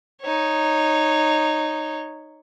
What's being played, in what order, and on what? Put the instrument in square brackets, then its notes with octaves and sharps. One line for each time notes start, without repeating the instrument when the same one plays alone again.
[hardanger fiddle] D#4 C#5